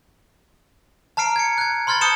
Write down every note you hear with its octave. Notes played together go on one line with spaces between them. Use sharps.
A5 A#5 F6 C7 D7
G#6 C#7
F#6 G#6
B5 C6 F6 G#6 A6
A5 D#6 G6 C#7 E7 G7